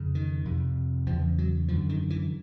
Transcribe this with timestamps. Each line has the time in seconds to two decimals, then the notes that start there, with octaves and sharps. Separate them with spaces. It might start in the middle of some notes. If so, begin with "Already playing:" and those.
Already playing: F2 C#3
0.15 D#3
0.45 F2 C3
1.06 E2 F3
1.11 C#3
1.38 F#3
1.68 F#2 D3 F3
1.89 D#3
2.10 E3